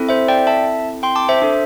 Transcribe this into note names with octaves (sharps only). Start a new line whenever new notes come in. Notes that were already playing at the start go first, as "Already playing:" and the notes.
Already playing: C4 E4 A4
C5 E5
D5 G5
E5 A5
G5 C6
A5 D6
C5 E5
D4 A4